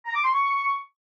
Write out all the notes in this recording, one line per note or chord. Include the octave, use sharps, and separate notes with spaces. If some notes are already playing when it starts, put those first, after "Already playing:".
A#5
D6
C6
C#6